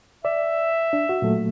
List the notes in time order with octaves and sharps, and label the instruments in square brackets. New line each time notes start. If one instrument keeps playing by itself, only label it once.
[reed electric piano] D5 [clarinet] E5
[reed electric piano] D4
F#4
A#2 F#3 A3